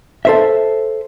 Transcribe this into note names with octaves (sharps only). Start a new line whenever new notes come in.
A4 C5 E5